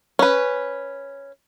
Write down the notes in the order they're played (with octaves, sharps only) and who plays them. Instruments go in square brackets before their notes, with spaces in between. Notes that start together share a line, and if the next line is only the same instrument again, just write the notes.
[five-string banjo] C#4 B4